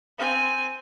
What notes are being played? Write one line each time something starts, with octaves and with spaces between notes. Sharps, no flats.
C4 G#5